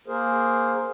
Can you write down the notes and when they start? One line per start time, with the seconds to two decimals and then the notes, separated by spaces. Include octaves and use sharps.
0.08 A#3 G#4 A#4 C5